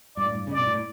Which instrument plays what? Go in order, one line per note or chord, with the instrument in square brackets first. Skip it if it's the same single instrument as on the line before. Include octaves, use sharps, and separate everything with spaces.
[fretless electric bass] G2 [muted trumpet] D5
[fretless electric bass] A2
G2
C#3
[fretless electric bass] B2 [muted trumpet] D5
[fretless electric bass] A2